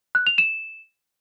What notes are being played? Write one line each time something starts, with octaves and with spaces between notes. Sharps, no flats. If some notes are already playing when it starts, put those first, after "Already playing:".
F#6
F7
E7